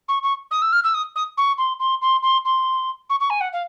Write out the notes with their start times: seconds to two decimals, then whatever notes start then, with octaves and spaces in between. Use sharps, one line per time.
0.08 C#6
0.23 C#6
0.51 D#6
0.62 E6
0.72 F6
0.84 E6
0.94 D#6
1.15 D#6
1.37 C#6
1.58 C6
1.79 C6
2.02 C6
2.22 C6
2.45 C6
3.10 C#6
3.20 C#6
3.30 G#5
3.41 F#5
3.52 F5